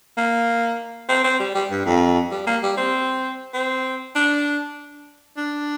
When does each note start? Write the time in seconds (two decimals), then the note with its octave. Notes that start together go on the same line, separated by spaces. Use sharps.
0.17 A#3
1.09 C4
1.24 C4
1.40 G3
1.55 G3
1.70 G2
1.86 F2
2.31 G3
2.47 A#3
2.63 G3
2.77 C4
3.54 C4
4.15 D4
5.37 D4